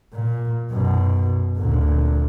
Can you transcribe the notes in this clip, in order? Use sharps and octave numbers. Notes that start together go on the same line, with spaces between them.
A#2
F#2 B2
D2 A#2